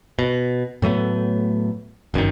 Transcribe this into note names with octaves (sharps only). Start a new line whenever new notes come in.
B2
A2 F#3 A3 B3
G1 F#2 D3 D#3